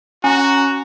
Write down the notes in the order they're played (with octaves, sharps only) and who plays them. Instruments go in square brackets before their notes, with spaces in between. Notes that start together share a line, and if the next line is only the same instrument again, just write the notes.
[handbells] C#4 [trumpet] F#4 [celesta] G#5 [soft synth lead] A#5